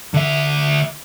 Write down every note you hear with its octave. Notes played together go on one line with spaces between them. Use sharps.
D3 E5